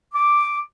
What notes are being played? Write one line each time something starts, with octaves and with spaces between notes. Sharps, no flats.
D6